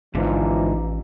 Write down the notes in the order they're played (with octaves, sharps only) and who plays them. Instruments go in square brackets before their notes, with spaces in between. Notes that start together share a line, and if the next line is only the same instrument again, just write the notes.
[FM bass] A1 [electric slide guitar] G#2 D3 [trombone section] E3 F3 D#4